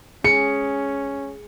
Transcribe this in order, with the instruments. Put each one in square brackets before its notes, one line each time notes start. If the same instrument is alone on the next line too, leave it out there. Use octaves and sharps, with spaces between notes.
[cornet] C#4 [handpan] G#4 [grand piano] C#7